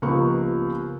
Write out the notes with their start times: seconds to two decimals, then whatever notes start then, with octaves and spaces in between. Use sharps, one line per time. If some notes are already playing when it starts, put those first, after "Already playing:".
0.02 C#2 F3 A#3 B3 G4 C#6